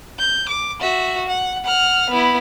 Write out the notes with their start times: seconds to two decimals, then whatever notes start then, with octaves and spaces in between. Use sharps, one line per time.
0.19 G6
0.49 D6
0.81 F#4 E5
1.28 F#5
1.65 F#5 F6
2.10 B3 E4